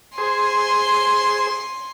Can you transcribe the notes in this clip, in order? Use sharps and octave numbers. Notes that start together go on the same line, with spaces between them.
G#4 C5 G#5 C6